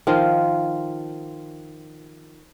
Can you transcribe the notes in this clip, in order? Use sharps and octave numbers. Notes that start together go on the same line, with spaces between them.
D#3 F3 F4